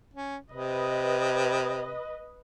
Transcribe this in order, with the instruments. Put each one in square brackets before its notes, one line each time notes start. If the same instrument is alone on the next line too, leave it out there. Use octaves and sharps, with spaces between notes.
[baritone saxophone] C#4
[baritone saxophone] C3 [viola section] B4 D#5